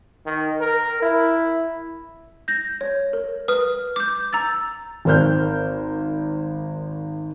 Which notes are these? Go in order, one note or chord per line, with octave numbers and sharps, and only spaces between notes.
D#3
A#4
E4
G6 A#6
C#5
A#4
B4 D#6 F6
D6 G6
A#5 E6 A6
G#1 A#4 C5 F6 G6